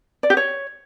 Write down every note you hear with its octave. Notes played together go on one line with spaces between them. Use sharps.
D5
G4
C#5